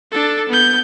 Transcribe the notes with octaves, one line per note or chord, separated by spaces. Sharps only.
D4 A4
B3 G6